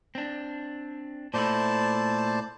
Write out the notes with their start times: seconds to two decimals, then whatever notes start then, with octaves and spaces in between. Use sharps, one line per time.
0.15 C4 D4
1.34 A#2 A3 E4 C5 D5 A5